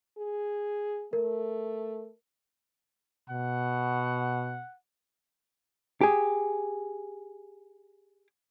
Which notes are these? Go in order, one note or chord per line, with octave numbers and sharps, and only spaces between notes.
G#4
A3 A#4
B2 F#5
G4 G#4